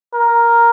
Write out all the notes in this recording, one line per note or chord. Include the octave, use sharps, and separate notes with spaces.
A#4